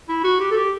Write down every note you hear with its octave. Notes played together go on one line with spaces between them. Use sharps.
E4
F#4
G4
A4
G4